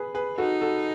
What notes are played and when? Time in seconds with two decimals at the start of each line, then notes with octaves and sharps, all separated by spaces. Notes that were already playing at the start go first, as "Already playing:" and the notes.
Already playing: G#4 B4
0.15 G#4 B4
0.38 D#4 F#4 A4
0.61 F#4 A4